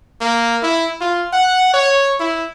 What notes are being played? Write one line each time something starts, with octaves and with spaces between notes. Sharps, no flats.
A#3
E4
F4
F#5
C#5
E4